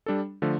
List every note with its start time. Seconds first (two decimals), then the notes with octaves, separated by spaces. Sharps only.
0.06 G3 D4 A4
0.42 D3 F3 A3